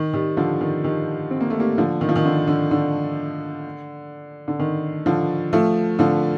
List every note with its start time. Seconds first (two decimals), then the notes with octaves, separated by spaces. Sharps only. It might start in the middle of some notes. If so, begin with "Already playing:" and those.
Already playing: D#3
0.14 D#3 G3
0.37 D3 F3
0.61 D#3
0.84 D#3 G3
1.31 C4
1.41 A#3
1.50 A3
1.60 G3 A#3
1.78 D3 F3
2.01 D#3
2.09 F3
2.16 D#3
2.25 D3
2.48 D3
2.71 D3
4.48 D3
4.59 D#3
5.06 D3 F3
5.53 F3 A3
5.99 D3 F3